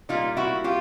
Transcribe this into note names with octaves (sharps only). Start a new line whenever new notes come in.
A#2 G3 A#3 D#4 F4
E4 F#4
F4 G4